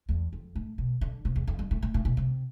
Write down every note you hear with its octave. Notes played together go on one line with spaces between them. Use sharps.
E2
F2
A2
B2
D3
C3
E2
F2
G2
A2
A2
A2
B2
C3